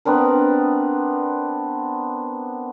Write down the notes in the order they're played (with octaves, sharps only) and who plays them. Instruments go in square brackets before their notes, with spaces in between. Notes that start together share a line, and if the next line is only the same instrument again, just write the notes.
[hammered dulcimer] B3 C4 D4 A#4